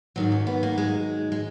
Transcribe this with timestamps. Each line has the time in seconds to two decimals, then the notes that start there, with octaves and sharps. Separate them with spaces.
0.16 G#2 D#3 F#3
0.32 C#4
0.47 B3
0.63 A#3
0.78 G#3
1.32 G#3